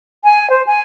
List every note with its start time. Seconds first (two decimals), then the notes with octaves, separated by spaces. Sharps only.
0.23 G#5
0.49 C5
0.66 G#5